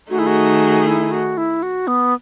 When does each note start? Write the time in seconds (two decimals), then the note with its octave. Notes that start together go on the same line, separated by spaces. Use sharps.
0.10 D#3 A3 D#4 F#4 G#4
0.19 E4
0.27 F#4
0.87 E4
1.12 F#4
1.37 E4
1.63 F#4
1.87 B3